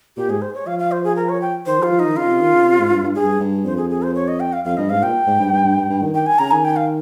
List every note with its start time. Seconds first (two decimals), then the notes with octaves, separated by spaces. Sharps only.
0.17 A#2 G4
0.29 G#2 G#4
0.42 C5
0.55 C#5
0.67 F3 F5
0.79 F5
0.92 C5
1.04 G#4
1.16 A#4
1.29 C#5
1.42 G5
1.66 D#3 C5
1.79 F3
1.83 F4
1.91 F3
1.99 D#3 D#4
2.16 C#3 F4
2.29 C3
2.41 D#3
2.53 C#3
2.66 C3
2.79 G#2
2.90 G2
3.03 G2
3.15 G2 G#4
3.40 G2
3.65 F2 C5
3.77 G#4
3.90 G#4
4.02 C5
4.15 C#5
4.28 D#5
4.40 G5
4.53 F5
4.65 F2 F5
4.77 G2 D#5
4.90 G#2 F5
5.02 A#2 G5
5.27 G#2
5.39 G2
5.53 G2
5.65 G2
5.77 G2
5.90 G2
6.02 D#3
6.14 D#3 G5
6.26 G#5
6.39 C#3 A#5
6.51 D#3 G#5
6.65 G5
6.76 F5